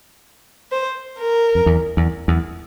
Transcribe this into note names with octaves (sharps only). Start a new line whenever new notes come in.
C5
A#4
F2
E2
E2
E2